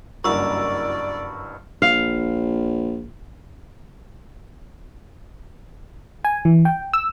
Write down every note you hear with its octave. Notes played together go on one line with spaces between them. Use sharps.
F#1 G2 E4 F#4 A#4 D5 C#6 E6
A#1 F5
G#5
E3
G5
E6